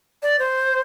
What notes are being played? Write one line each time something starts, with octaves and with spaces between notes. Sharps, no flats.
D5
C5